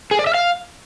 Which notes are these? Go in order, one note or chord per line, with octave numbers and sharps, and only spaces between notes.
G#4
D5
E5
F5